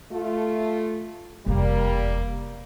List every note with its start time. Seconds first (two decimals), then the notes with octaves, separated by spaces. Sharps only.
0.11 A3 F4
1.46 F1 E2 G3 A#3